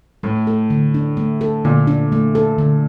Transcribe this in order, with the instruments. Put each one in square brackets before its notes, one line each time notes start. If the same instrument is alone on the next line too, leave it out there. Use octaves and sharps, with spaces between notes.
[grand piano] A2 [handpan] A3
[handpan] A4
D3
D4
A3
A4
[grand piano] A#2 [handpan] D3
[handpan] D4
A3
A4
D3